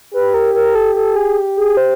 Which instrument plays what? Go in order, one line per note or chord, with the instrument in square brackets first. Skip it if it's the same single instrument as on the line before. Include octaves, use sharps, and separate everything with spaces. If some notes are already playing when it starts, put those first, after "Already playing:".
[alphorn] G4 [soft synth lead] B4
[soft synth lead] A#4
A#4
A4
A4
G#4
G#4
C5